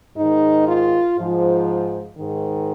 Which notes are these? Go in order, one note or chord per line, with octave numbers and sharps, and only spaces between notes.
G#2 D#3 D#4
F4
G#2 F3
G#2 D#3